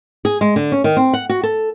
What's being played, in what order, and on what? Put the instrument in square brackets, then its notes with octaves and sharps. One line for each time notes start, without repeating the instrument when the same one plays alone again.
[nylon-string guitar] G#4
G#3
D3
C#4
D#3
C4
F#5
F#4
A4